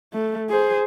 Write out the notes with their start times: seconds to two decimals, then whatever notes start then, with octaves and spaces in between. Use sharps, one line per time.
0.13 A3
0.50 G#4 C5